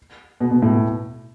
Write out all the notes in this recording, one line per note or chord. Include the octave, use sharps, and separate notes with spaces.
B2
B2
A2
B2